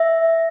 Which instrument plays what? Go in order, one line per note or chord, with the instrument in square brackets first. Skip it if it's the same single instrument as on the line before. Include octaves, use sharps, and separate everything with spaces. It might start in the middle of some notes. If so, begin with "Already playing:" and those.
Already playing: [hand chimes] E5